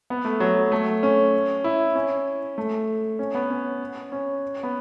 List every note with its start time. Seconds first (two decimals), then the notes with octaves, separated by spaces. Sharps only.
0.10 B3
0.25 A3
0.40 F#3
0.72 A3
1.03 C#4
1.64 E4
1.95 C#4
2.58 A3
3.19 C#4
3.35 B3
3.50 C#4
4.12 C#4
4.63 B3